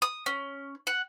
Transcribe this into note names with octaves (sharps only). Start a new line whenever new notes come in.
D#6
C#4
F#5